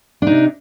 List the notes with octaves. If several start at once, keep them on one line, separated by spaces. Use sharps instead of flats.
C3 D4 D#4